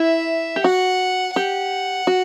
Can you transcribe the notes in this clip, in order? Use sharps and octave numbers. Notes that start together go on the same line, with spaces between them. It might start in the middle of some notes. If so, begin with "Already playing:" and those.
Already playing: E4 E5
G4
F#4 F#5
G4 F#5
F#4